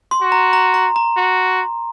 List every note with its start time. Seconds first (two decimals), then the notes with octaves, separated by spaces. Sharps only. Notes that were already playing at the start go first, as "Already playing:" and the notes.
0.11 C6
0.22 F#4
0.32 A#5
0.53 A#5
0.74 A#5
0.96 A#5
1.17 F#4